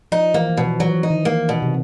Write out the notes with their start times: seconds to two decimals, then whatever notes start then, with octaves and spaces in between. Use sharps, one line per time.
0.12 F3 D#4
0.34 E3 A#3
0.49 E3
0.57 B2
0.65 F3
0.80 E3 F#3
0.95 E3
1.03 D#4
1.10 D#3
1.25 A#3
1.49 B2
1.62 C3